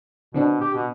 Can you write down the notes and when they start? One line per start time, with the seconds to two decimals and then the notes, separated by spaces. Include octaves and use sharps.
0.34 B2 D3 C4 D4
0.61 G4
0.74 B2